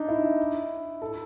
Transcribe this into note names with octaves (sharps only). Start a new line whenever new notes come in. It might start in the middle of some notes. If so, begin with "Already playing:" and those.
Already playing: D4 D#4
E4
A4